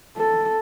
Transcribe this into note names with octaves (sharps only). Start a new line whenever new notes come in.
A4